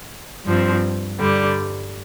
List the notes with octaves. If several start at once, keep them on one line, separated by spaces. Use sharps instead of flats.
G2 F3 C4
G2 D3 G3